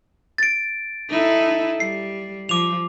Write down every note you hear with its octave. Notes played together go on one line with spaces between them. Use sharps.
A6 D7
D#4 E4 A4
G3 C7
F3 D6 F7